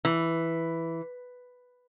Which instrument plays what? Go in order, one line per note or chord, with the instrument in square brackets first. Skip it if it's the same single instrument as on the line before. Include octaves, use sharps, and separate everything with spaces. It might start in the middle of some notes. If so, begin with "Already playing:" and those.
[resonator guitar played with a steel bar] E3